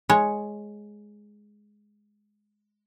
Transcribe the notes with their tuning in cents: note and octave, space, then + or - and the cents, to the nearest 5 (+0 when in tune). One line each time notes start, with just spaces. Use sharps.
G#3 +5 C#5 +0